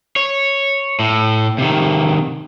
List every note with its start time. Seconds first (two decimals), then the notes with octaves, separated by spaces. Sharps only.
0.16 C#5
0.99 A2
1.58 C3 D#3